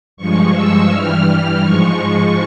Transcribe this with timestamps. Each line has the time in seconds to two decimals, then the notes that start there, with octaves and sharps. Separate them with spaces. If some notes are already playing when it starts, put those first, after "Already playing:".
0.17 G2 F3 G#3 C#6
0.53 E6
0.89 G2 E3 G3 F6
1.62 G#2 F3 G#3 C#6